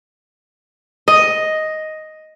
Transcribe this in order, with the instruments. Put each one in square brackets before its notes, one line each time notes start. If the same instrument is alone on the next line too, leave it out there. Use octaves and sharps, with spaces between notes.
[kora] D#5